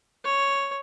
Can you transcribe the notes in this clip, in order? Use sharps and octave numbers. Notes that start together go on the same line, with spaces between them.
C#5